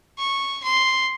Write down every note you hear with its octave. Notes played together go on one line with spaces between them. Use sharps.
C#6
C6